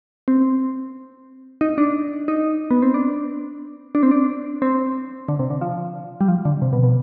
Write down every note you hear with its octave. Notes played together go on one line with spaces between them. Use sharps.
C4
D#4
D4
D#4
B3
C4
D4
D4
C4
D4
C4
D3
C3
D3
F3
G3
F3
D3
C3
B2
B2